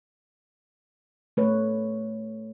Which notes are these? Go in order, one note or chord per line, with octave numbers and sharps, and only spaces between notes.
A3 B4 C#5